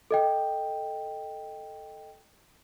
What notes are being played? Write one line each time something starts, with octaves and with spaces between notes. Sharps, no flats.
A4 D#5 G5